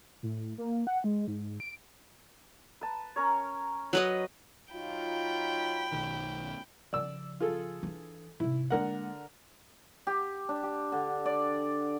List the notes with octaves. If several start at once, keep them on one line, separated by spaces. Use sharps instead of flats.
A2
A#3
F#5
G#3
G#2
D7
B4 A5
C#4 A#4 C#5
F#3 B4 D#5
F#3 D#4 F4 G5 B5
B1 D#3
C#3 F3 D5 E6
F4 G#4 A4
E3 D4
G#2 C3 E4
D3 G#3 A#3 A#4 F#5
G4
D4
G4
D3
D5